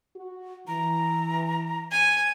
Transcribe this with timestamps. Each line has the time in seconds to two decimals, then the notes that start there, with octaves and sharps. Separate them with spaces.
0.15 F#4
0.67 E3 A#5
1.91 G#5 G#6